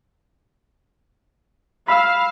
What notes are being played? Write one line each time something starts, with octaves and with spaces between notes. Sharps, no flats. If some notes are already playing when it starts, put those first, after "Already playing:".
F5 B5 E6